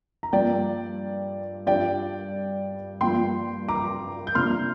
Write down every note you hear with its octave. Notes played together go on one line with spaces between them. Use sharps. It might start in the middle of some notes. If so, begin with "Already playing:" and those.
A#5
G2 F3 A#3 D5 G5
G2 G3 D4 F4 D5 G5
G2 F3 A#3 F4 G5 C6
A#5 D6
G6
C3 A#3 D4 F4 C6 F6